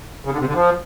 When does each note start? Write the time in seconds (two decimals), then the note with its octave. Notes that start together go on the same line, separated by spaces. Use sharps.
0.25 C#3
0.32 D3
0.39 C3
0.47 D3
0.54 F3